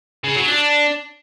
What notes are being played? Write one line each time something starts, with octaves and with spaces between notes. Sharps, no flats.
C#3
F#3
D4